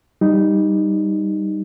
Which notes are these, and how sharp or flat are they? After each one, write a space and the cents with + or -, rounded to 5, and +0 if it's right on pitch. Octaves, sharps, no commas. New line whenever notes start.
G3 +0 D#4 +0